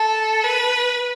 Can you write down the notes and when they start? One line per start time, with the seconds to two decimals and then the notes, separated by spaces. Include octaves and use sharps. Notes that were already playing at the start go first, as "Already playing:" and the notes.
Already playing: A4
0.44 B4